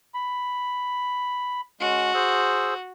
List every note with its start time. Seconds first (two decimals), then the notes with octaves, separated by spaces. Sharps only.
0.14 B5
1.80 G#3 C#4 F#4
2.14 G#4 C5 E6